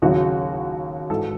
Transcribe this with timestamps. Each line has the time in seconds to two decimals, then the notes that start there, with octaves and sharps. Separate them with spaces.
0.02 D#2 C#3 F#3 F#4
1.10 G#2 E3 A4